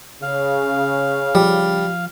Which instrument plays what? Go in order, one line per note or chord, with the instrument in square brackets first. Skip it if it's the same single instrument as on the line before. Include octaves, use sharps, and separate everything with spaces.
[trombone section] C#3 [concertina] F5
[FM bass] F3 [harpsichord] G3